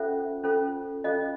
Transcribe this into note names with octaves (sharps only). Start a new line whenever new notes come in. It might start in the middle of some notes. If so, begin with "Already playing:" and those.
Already playing: C#4 F4 A4 C5 E5 F#5
C#4 F4 A4 C5
C#4 F4 A4 C5 D#5 F5